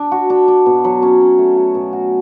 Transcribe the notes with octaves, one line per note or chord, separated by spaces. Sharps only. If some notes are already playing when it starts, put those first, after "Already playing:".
Already playing: D4
F#4
D4
D4
B2
F#3
C#4
C#4
A3
F#4
B2
F#4